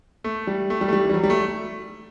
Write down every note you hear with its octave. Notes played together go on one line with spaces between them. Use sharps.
A3
G3
A3
G3
A3
G3
E3
G3
F#3
G3
A3